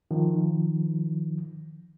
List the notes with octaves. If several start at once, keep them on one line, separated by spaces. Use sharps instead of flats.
D#3 F3